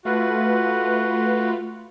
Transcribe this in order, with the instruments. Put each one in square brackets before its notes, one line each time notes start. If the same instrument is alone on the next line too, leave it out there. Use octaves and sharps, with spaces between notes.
[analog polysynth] A3 F4 B4 [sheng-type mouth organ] F#4